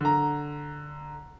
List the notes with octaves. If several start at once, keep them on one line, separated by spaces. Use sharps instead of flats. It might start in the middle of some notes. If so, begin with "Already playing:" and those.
D3 A#5